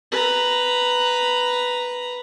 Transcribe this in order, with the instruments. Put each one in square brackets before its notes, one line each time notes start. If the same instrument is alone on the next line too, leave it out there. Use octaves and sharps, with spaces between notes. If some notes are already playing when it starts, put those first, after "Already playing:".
[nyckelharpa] B4 A#5